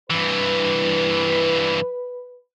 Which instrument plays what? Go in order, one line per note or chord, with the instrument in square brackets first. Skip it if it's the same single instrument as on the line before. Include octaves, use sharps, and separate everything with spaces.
[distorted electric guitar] G2 E3 [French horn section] B4